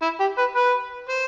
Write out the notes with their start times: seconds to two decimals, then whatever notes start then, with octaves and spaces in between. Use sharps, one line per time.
0.02 E4
0.20 G4
0.38 B4
0.55 B4
1.09 C5